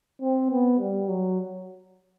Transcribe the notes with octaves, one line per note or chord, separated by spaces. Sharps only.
C4
B3
G3
F#3